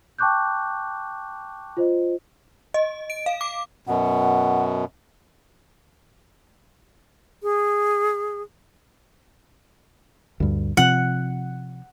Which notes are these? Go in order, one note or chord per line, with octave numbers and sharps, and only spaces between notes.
G5 A5 C#6 D6 F#6 G6
F4 C5 D#5
D#5
D7
F5
D6
F#2 B2 F#5
G#4
D2 G2
C3 F3 F#5